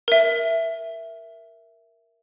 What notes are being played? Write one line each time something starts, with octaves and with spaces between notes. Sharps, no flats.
A#4 E5